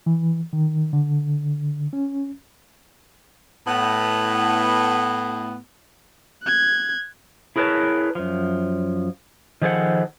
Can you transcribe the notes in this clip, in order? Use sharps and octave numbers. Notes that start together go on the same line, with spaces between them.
E3
D#3
D3
C#4
A2 B3
F#6 G#6
E4 G#4 A#4 B4 C#5 A5
F#2 F3
D#3 F3 G#4 A4 C5 F#5